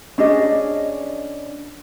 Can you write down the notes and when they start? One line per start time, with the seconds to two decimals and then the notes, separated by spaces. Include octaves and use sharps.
0.18 C#4 D4 G#4 D#5